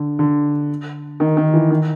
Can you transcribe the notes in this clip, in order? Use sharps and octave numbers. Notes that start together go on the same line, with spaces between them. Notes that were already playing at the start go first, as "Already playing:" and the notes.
Already playing: D3
D3
D#3
D#3
E3
D#3